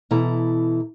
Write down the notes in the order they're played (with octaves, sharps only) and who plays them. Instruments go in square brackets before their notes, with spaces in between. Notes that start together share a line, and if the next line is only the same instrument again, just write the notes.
[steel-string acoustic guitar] B2 E3 E4 A4 A#5